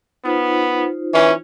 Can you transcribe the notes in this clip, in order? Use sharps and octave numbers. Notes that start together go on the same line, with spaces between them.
B3 D#4 F4 C5
E3 C#4